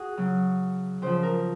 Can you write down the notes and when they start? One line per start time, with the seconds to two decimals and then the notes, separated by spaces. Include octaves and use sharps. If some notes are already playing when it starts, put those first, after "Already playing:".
Already playing: F#4 G#4
0.17 C#3 F#3
1.02 C#3 F3 C5
1.23 A#4